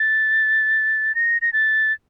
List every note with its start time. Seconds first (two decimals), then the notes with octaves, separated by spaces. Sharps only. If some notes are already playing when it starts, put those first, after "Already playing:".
Already playing: A6
1.15 A#6
1.42 A#6
1.53 A6